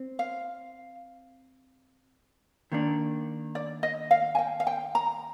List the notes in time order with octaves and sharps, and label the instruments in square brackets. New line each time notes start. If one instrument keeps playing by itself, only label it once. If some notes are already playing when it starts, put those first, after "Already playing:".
Already playing: [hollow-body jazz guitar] C4
[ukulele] F5
[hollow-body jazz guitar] D#3 A#3 D4
[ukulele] D5
D#5
F5
G#5
G5
F5
G5
A#5